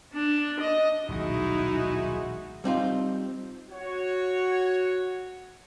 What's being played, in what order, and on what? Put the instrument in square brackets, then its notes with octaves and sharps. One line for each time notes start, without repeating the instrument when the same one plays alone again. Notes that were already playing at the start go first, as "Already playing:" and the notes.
[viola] D4
D#5
[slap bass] D#1 B1 [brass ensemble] G#3 F#4 [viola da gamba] D#4 E4
[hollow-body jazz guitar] G3 C4 D#4 F4
[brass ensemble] F#4 C#5